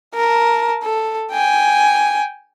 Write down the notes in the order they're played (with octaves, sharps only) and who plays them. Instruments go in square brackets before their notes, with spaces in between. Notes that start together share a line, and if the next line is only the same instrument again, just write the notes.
[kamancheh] A#4 A5
A4
G5 G#5